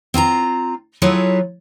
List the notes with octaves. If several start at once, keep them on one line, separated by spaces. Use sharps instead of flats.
C4 F4 G#5 A#5
F#3 E4 F4 G#4 A4 C#5